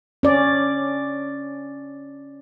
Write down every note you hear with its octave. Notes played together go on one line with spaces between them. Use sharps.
C#4 D5